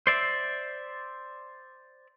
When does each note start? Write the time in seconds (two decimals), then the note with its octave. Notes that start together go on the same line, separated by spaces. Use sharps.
0.07 C5 D5 E5